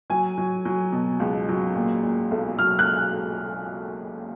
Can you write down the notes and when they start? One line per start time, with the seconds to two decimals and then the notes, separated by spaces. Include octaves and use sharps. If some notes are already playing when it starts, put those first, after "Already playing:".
0.10 F#3 G#5
0.38 F#3
0.65 F#3
0.92 B2
1.20 C#2
1.49 F#3
1.75 A#2
2.03 A#2
2.31 B1
2.59 F#3 F6
2.79 F#6